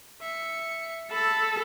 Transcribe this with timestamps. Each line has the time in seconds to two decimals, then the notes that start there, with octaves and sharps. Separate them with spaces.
0.21 E5 C#7
1.11 A4 B5 E6